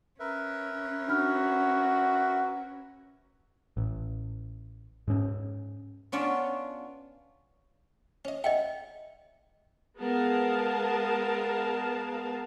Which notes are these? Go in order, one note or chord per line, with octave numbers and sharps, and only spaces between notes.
C#4 A#4 B4 E5
D4 F#4 B5 F6
A1
G#2 C#4
B3 C#4 D4 F4
C#4 D#5
D#5 E5 F#5 G5 A#5
G#3 B3 G#4 A#4 F5 A5